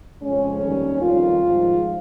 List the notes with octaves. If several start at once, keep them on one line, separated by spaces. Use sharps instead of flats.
F2 C#3 G#3 C#4
D#2 D#3 G3
F2 D#3 G3 F4
G#2 F3 G#3